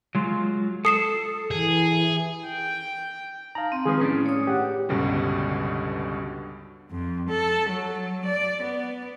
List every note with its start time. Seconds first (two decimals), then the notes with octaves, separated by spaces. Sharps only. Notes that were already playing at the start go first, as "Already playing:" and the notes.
0.15 F#3 G#3 F4
0.85 A4 D#6 C7 E7
1.51 E3 G#4
2.47 G5
3.55 D#4 F5 A5 A#5
3.72 C4
3.86 D#3 F3 G#3 G#4 B4
4.00 A2 C#4 D4 E4
4.26 C#5 D#6
4.47 G4 F#5
4.89 C#2 G2 B2 D3 G3 C#4
6.91 F2
7.29 A4
7.70 F#3
8.25 D5
8.63 B3